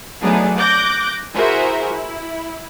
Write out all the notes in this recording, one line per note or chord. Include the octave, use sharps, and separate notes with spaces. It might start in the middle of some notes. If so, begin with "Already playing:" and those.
F#3 A3 B3 D4 D#4 G#4
D6 F#6 G6 A#6
E4 F#4 G#4 A#4 C5 E5
E4